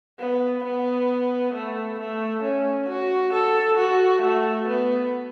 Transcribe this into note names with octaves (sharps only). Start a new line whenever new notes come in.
B3
B3
A3
A3
C#4
F#4
A4
F#4
A3
B3